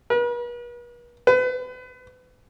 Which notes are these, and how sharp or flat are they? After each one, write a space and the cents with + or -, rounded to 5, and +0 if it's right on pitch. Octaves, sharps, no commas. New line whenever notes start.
B4 -45
B4 +35